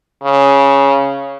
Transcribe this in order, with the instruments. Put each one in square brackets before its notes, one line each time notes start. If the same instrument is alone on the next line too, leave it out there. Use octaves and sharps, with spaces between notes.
[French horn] C#3